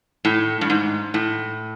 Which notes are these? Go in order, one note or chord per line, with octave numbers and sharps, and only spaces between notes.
A2
G2
G#2
A2